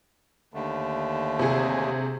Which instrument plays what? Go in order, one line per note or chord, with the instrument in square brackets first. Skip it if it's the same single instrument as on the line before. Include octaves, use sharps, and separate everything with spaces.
[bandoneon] D#2 D3 A3
[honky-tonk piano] C3 G#4